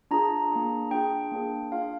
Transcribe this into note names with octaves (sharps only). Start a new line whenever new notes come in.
D4 F4 G#4 A#5
A#3 D4 G#4
D4 F4 G#4 G5
A#3 D4 G#4
D4 F4 G#4 F5